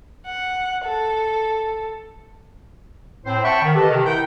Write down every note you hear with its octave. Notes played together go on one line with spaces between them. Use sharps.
F#5
A4
A2 C4 C5
E5 F#5 G5 A5 B5 C#6
D#3
G4 A4 B4 D#5 A5
C3 D#3
E4 A#4 F#5 G5